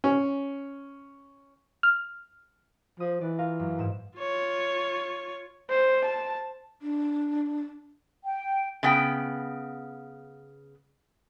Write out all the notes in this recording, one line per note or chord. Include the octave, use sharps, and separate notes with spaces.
C#4
F6
F3 D#6
E3 D5
F4 A#4 F5
F#2
G#2 E7
F4 C#5
C5
A5
D4
G5
C#3 B3 G5